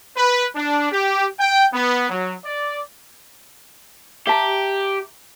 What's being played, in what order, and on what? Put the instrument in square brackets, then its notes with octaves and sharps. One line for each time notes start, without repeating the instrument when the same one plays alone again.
[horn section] B4
D4
G4
G5
B3
F#3
D5
[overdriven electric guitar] G4 [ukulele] E5 A5 A#5